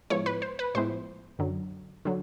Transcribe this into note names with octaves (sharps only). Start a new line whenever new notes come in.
A2 F3 G#3 B3 E4 C#5
B4
C5
B4
A2 F3 G#3 B3 E4 C5
F#2 D3 F#3
D3 F#3